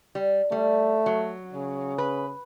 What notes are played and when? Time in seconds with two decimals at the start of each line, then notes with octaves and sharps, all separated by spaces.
0.15 G3
0.52 G3 A3
1.06 F#3
1.54 C#3
1.98 B4